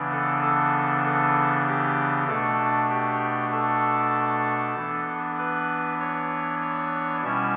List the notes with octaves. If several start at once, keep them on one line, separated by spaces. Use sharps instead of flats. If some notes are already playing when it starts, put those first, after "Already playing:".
Already playing: C#3 E3 B3 D4
A4
A4
A4
G4
B2 A3 D4 A4
G4
A4
E3 B3 D4
B4
C#5
C#5
B2 G3 C#4 E4 E5